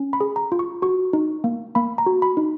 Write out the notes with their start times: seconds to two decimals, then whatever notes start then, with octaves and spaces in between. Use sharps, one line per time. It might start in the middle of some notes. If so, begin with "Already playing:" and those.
Already playing: C#4
0.13 B5
0.20 G#4
0.36 A#5
0.52 F4
0.59 C#6
0.82 F#4 C#6
1.13 D#4
1.44 A#3
1.75 A#3 B5
1.98 A#5
2.06 F#4
2.22 B5
2.37 D#4